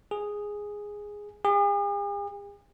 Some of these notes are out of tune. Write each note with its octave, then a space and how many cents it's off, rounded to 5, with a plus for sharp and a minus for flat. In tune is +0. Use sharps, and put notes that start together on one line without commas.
G#4 -5
G#4 -45